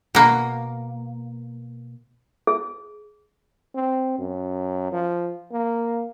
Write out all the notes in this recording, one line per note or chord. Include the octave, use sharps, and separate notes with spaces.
B2 A#3
G#4
C4
F#2
F3
A#3